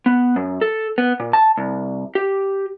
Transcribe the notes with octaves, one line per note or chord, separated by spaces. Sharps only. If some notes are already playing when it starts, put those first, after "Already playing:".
B3
F#2
A4
B3
A#2
A5
C2
G4